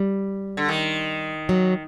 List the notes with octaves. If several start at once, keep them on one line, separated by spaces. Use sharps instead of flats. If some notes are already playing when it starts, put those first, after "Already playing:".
Already playing: G3
D3
D#3
F#3